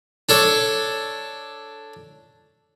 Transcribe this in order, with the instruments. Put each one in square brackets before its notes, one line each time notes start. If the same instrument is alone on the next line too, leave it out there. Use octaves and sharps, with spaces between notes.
[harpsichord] D4 A4 C#5